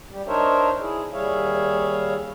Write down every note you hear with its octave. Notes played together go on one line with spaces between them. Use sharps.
G3 G4
D4 D#4 A#4 C5 C#5 E5
E4 G#4
D#2 G3 G#4 C#5 E5 F5